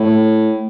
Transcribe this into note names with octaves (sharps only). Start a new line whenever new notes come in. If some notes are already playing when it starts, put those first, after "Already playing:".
Already playing: A2